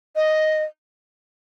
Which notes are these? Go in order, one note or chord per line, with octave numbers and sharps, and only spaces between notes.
D#5